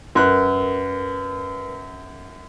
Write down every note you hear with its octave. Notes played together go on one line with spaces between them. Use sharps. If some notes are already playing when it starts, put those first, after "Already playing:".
F#2 A#4 B4 F#6